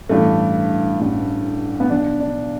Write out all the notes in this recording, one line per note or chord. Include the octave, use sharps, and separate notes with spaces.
A1 G2 E3 A3
A1 G2 E3
B3
B1 B2 D4
D4